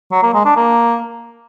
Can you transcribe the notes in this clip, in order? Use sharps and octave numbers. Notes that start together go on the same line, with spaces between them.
F#3
A#3
G#3
D4
A#3